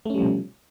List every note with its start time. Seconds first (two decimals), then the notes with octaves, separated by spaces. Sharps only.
0.06 A3
0.10 C#4
0.14 G3
0.19 F3
0.23 B2